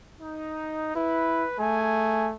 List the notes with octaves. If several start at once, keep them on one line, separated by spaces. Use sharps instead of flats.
D#4
E4 B4
A3 G#4 G#5